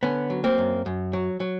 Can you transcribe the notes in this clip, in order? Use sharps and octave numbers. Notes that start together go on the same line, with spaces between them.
D3 B3 C#4
F#3
A#3 C4
F#2
F#2
F#3
F#3